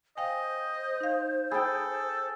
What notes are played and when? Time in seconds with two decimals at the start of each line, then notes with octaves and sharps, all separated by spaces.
0.17 C5 D#5 F5 G5 G#5
1.00 D#4 F5
1.51 G#4 A4 G5 B5 A6